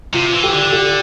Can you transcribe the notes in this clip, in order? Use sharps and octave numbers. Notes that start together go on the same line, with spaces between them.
C3 F4
E3
G4
D3
G4